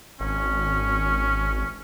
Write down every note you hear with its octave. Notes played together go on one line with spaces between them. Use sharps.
G#1 C#4